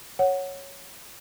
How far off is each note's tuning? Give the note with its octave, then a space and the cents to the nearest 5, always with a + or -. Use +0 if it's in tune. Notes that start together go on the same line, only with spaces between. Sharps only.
C#5 -5 F#5 +0